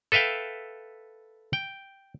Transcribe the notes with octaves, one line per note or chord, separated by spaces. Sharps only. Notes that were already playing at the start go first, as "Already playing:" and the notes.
A4 B4 E5 F5 G5
G5